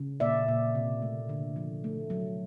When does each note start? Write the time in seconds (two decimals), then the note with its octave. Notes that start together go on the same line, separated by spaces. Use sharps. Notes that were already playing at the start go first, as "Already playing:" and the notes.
Already playing: C#3
0.20 A#2 D5 E5
0.48 A#2
0.75 C3
1.02 A3
1.29 D3
1.56 F3
1.84 A3
2.10 F#3